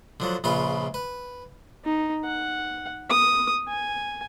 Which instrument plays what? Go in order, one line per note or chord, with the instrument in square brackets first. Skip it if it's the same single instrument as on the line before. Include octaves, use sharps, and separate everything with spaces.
[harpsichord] D3 F3 F#3
A#1 C#3 F4 B4 B5
B4
[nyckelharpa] D#4
F#5
D#6
G#5